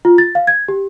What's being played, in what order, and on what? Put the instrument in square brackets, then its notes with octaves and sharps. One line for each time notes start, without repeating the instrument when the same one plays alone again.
[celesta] F4
A6
F5
G#6
G4